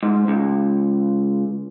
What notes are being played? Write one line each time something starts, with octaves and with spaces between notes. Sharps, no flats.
G#2
C#2